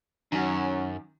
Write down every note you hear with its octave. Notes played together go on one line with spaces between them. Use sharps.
F#2 D#3 F#3 C#4